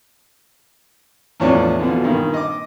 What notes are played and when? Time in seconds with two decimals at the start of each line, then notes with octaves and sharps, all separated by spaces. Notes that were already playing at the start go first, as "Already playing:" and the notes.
1.40 E2 A2 E3 F3 C#4 D4
1.79 B2 D3 E3 F3
2.04 G2 A#2 D#3
2.34 D#5 D6